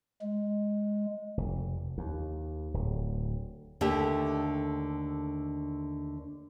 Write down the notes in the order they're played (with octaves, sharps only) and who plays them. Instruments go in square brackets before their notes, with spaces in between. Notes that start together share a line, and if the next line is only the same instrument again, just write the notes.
[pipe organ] G#3
[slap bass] F1
D#2
D1
[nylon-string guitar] D#2 D3 A3 D4 G4 E5